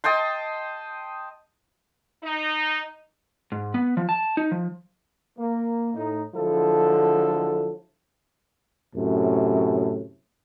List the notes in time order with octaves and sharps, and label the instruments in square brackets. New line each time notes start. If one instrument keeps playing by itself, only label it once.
[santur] D#5 G5 A5 C6
[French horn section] D#4
[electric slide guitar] G#2
B3
F3
A5
D#4
F3
[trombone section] A#3
A2 D#4
D3 F3 F#3 G#3 E4 A4
F#2 A2 C3